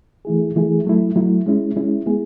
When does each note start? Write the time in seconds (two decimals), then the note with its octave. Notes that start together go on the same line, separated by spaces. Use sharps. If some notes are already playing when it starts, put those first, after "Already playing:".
0.25 E3 A3 E4 G#4
0.56 E3 A3 E4 G#4
0.85 F#3 A3 E4
1.16 F#3 A3 E4
1.46 G#3 C#4 E4
1.76 G#3 C#4 E4
2.06 G#3 B3 E4 G#4